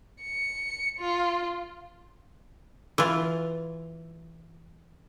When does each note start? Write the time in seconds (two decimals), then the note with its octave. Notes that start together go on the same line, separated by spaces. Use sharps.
0.22 C#7
0.99 F4
2.98 E3 F4